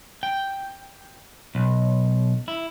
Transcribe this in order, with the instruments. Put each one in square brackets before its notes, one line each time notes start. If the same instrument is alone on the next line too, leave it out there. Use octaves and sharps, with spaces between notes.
[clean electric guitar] G5
B1
E4